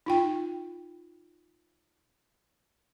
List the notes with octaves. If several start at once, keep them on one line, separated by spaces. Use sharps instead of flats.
D#4 F4 G5